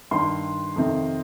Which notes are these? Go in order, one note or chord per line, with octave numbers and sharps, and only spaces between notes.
G2 D#3 C6
F2 C3 D#3